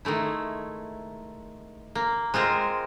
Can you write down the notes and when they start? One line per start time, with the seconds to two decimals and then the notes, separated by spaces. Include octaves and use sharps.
0.05 D#3 G#3 A3 E4
1.95 A#3
2.34 G#3 C4 F4 A#4 C5